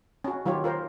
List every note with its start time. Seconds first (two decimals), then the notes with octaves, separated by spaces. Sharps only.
0.24 C#4 F#4
0.45 D#3 F#3 F4 G4 C#5
0.64 F4 A#4 C5